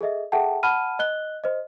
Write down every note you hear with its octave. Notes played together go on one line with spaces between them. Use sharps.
G#4 A4 D#5 E5
G#4 A4 E5 F#5 G5 A5
F#5 A5 B5 F6 D#7
D#5 F#6 G7
C5 D#5